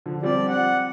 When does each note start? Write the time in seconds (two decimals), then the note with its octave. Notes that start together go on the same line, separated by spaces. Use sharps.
0.06 D3 F3
0.23 F3 G3 C4 D5
0.48 F#5